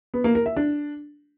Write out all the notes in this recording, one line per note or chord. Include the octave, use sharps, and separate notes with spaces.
B3
A#3
A#4
E5
D4